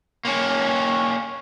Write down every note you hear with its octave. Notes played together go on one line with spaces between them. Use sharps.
A#3 C#4